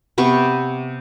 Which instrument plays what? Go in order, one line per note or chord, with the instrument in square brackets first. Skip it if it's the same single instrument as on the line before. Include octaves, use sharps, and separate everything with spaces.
[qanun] C3 B3 C#6